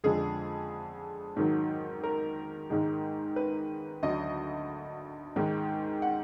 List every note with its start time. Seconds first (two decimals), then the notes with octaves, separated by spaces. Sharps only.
0.04 F2 D3 F3 G#3 G#4
1.37 G#2 D#3 F#3
2.03 A#4
2.70 G#2 D#3 G#3
3.36 B4
4.03 D2 D3 F#3 D#5
5.36 G#2 D#3 G#3
6.02 F#5